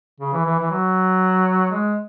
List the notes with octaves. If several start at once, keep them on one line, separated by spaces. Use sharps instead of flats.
C#3
E3
E3
E3
F#3
G#3